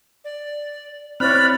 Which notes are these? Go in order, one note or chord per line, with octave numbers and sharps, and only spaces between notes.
D5
C4 E4 C#5 D5 B5 F6 F#6